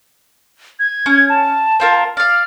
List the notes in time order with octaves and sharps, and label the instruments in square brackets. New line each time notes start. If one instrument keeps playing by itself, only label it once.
[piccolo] G#6
[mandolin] C#4
[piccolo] A5
[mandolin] C4 F4 A#4
[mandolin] D5 F5 [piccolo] F6